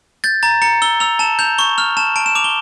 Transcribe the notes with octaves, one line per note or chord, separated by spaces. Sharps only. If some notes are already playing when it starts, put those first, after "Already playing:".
G6 A6
A#5 A6
A#5 C#7
E6 G7
E6 F7
A5 E7
G6 F7
C#6 G7
F6 F7
A5 E7
A5 D7
E7
D6 F7
G7